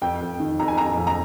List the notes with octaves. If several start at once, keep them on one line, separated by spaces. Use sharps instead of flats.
F2 G5
F2
D#3
F2 A#5
G#5
F2 A#5
F2
A#5